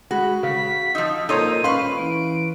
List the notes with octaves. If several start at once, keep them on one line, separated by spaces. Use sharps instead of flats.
G#3 F#4 B5
C#3 B6
F3 D#4 E6
A#2 D#4 A4 C5 C#5 A#5 D#7
C#4 B4 F5 C6 C#6
E3 D7